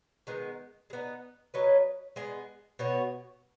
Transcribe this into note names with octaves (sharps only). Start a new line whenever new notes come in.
D#3 G#3 B3
G#3
B3 D#4
F#3 C#4 B4 D#5
G#3 B3 G#4 D#5
B2 B3 F#4 C#5